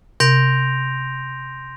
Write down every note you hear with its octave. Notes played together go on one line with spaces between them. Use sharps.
C3 C6 G6 A#6 D7 F7